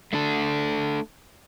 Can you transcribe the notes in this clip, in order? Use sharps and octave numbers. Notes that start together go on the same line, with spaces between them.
A3 D4 A4